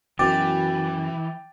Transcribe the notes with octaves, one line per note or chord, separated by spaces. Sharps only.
F#2 B2 E3 G5 D6 A6